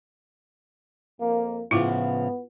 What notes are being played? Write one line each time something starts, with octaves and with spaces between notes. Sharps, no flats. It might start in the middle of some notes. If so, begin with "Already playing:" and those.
F2 A#3
A2 C#3 F3 B3 E4 F4